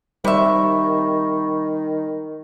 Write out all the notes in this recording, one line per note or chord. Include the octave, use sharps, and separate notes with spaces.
C3 D#3 G3 E5 B5 C#6